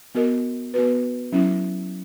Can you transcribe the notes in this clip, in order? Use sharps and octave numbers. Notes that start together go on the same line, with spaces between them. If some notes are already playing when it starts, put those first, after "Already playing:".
B3 F#4 A#4 D#5
B3 F#4 B4
F#3 C#4 E4